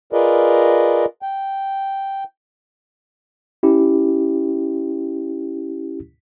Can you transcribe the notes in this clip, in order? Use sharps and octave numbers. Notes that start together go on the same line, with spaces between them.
F4 G#4 A#4 B4 D5 D#5
G5
C#4 E4 G4